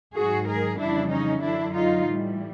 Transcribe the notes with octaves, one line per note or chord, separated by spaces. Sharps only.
G#2 D#3 F#3 F#4 G#4
G#4 A#4
F2 C#3 E3 G3 D4 E4
C#4 D#4
F#2 D3 F#3 D4 E4
D#4 F4
A2 E3 G3